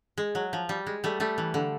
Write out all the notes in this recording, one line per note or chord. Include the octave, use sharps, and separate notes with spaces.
G#3
F#3
F3
G3
G#3
G3 A3
G3 A3
E3
D3